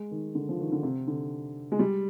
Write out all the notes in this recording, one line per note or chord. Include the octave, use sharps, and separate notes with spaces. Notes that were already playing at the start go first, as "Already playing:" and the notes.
Already playing: G#3
D#3
D3
F3
D#3
D3
C3
D3
G#3
G3